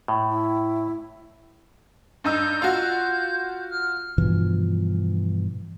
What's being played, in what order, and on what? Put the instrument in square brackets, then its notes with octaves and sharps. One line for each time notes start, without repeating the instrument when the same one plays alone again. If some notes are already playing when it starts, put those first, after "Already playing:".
[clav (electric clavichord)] A2
[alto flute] E4
[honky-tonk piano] G2 D#4 E6 [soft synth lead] G6
[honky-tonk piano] F4 F#4
[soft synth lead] F6
[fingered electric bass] G2 B2 E3 F3